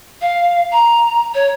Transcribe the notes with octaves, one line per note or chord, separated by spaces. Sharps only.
F5
A#5
C#5